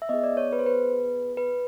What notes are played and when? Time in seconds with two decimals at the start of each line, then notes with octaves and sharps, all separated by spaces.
0.02 E5
0.09 B3 E4 G#4 D#5
0.24 D5
0.37 C#5
0.53 B4
0.59 C5
0.66 B4
1.37 B4